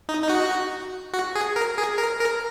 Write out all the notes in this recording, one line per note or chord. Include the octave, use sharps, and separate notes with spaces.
D#4
D#4
F#4
F#4
G#4
A#4
G#4
A#4
A#4